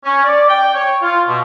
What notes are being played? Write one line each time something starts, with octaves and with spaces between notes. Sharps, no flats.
C#4
D5
G5
C#5
F4
B2